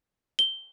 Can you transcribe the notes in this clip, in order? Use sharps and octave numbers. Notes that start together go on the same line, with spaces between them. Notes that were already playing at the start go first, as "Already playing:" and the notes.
G7